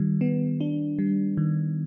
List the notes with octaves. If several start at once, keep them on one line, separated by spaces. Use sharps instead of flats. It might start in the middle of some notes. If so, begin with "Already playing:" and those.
Already playing: D#3 G3
B3
D4
G3
D#3